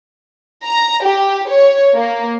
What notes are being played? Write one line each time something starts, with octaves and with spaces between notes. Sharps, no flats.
A#5
G4
C#5
A#3